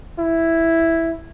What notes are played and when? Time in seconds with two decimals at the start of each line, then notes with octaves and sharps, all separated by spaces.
0.19 E4